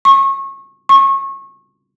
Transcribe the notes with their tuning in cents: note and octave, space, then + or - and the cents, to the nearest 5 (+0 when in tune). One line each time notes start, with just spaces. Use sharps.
C#6 -25
C#6 -25